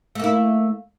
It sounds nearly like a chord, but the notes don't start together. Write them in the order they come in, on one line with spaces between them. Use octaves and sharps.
A3 A#3 E4